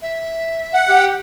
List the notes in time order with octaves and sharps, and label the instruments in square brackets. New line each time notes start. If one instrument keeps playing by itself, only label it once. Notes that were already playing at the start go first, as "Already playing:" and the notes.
[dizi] E5
[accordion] F#5
[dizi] G4